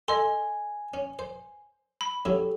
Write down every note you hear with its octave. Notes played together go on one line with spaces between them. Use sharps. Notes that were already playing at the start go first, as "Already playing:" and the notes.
A4 D#5 G#5 C6
C#4
C5
B5
F#3 C#4 E4 G4 A4